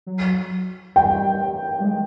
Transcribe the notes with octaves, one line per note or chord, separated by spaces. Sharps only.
F#3
G3 G5
G3
G#3